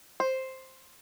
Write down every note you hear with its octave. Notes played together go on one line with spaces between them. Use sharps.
C5